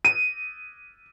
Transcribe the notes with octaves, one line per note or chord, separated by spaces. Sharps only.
D#7